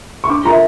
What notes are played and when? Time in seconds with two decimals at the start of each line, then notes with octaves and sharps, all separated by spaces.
0.24 C#6
0.29 D4 D6
0.45 F4 A#5
0.48 A#4 E5